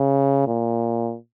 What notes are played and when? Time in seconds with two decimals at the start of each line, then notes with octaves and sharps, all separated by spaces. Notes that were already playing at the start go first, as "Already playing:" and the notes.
Already playing: C#3
0.47 A#2